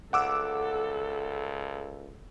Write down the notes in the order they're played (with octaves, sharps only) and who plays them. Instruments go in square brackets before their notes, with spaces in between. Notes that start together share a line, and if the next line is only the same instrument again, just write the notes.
[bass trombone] C#2 [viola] A4 [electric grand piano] F#5 D6 E6